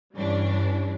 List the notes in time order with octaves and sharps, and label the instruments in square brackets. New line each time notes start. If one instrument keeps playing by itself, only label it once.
[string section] G2 E3 G3 C#4 D4